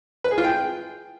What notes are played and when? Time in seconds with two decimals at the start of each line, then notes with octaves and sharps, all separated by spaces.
0.24 B4
0.31 G#4
0.38 F4
0.44 G5